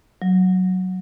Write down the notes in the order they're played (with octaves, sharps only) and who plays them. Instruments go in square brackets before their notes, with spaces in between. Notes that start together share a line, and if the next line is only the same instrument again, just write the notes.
[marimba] F#3